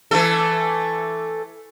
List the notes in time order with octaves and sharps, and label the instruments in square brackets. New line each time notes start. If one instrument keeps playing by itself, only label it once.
[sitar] E3 A3 A4